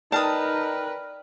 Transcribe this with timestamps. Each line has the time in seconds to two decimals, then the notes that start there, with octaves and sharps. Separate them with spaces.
0.12 D#4 A#4 B4 D5 G5 A5 D#6 F6